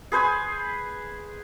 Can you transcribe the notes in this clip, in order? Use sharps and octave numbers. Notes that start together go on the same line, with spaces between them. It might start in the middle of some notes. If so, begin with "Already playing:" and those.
G#4 B4 C5 G#5